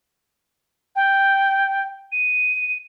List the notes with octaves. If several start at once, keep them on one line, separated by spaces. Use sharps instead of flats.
G5
D#7